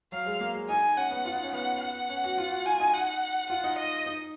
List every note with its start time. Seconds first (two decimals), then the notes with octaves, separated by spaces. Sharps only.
0.12 F#3 F5
0.26 G#3
0.41 A#3
0.54 G#3
0.69 D#4 G#5
0.97 C#4 F#5
1.11 B3
1.25 F4
1.35 D#4
1.43 C#4
1.53 B3 F#5
1.82 F#5
2.10 C#4
2.24 F#4
2.38 F4
2.51 F#4
2.66 F4 G#5
2.80 D#4
2.93 F#5
3.50 F4 F#5
3.64 D#4
3.78 D#5
4.06 D#4